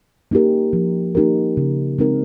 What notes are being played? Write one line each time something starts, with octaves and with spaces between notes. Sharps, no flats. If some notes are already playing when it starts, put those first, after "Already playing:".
A#3 D#4 G4 A#4
F3
A#3 D#4 G4 A#4
C#3
G#3 C4 D#4 A#4